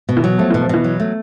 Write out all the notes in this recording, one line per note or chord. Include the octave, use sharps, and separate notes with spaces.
B2
E3
F#3
F3 A3
E3
B2
F3
B2 E3
F#3
A3